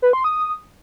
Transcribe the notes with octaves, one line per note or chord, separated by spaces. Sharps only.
B4
C6
D#6